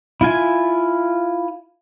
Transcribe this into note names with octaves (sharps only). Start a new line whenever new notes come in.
E4 F4 G#5